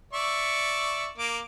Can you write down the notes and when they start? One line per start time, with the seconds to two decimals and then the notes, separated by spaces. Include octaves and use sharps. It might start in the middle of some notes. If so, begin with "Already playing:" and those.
0.13 D5 E5 C#6
1.18 A#3 D6